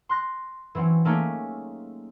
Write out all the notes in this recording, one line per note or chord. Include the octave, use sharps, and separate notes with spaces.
C6 F#6 A#6
E3 F#3 C4 C#4
A3 A#3 C#4 D#4 G4 G#4